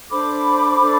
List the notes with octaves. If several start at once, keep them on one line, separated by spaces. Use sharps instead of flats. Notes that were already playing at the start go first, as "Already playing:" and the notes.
D4 A4 C5 B5 D6
D4 A4 C5